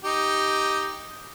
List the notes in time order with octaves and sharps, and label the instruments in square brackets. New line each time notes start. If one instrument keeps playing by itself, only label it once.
[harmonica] D#4 G4